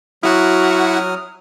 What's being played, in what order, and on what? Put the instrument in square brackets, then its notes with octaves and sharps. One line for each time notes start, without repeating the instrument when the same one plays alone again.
[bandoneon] F#3 D#6 F6 [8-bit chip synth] E4 F#4 F#5